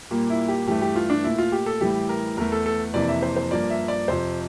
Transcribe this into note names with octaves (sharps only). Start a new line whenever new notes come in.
A#2 G3 A#3
E4
G4
G2 E3 A3 G4
G4
F4
D4
A#2 A3 E4
F4
G4
A4
A2 E3 G3 G4
A#4
E2 E3 A3 A#4
A4
A4
F2 C3 E3 A#3 D5
E5
C5
C5
G2 F3 A#3 D5
E5
D5
F2 C3 F3 C5